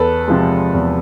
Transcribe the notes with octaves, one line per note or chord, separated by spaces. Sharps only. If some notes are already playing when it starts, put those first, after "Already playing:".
Already playing: E2 A4 B4
C3 F3 G#3
E2